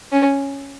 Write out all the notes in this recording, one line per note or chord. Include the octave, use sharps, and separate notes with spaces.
C#4